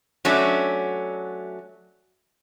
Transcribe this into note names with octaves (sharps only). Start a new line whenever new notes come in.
F#3 A3 C#4 D4